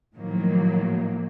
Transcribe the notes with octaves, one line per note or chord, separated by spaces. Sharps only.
A2 D#3 F3 F#3 A#3